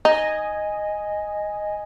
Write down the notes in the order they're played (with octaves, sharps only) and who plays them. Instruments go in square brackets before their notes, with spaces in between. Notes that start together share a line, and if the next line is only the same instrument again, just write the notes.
[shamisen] D#4 [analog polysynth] D#5 G#5